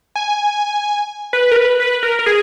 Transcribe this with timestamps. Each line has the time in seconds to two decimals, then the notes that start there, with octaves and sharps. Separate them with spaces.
0.15 G#5
1.33 B4
1.51 A#4
1.56 B4
1.80 B4
2.03 A#4
2.19 A#4
2.26 G#4